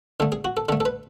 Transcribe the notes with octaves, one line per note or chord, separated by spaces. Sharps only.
D3 A3 A4
G#4
F#4
A4
D3 A3 A4
A4
B4